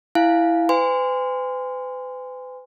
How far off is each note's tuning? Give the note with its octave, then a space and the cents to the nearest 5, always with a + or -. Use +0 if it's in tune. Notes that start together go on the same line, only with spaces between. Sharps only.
E4 +0 F5 +0 G#5 +20
B4 +45 G#5 -30 C6 -25